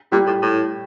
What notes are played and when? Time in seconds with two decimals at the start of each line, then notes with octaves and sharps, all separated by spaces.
0.12 A#2 G3 G4
0.26 A2
0.43 A2